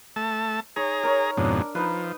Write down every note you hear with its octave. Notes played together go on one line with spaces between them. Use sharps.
A3 A5
D#4 G#4 C#5 A#5
A#4 C#5
F2 G#2 B2 D4
F3 D#4 B4